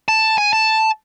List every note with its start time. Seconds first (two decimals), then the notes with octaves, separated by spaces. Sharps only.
0.08 A5
0.38 G#5
0.53 A5